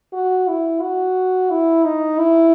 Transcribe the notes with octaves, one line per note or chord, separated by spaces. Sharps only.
F#4
E4
F#4
E4
D#4
E4